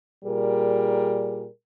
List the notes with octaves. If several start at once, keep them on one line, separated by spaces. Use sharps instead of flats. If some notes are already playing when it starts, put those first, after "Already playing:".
A#2 G3 G#4 A#4